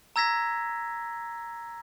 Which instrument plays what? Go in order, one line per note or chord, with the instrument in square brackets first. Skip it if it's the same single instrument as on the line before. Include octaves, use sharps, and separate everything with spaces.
[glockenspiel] A#5 E6 G#6 A#6 B6